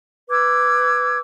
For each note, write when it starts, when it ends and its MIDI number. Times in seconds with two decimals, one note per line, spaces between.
0.30 1.18 71
0.30 1.18 86
0.30 1.18 88
0.30 1.18 92